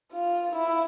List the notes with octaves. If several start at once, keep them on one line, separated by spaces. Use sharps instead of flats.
F4
E4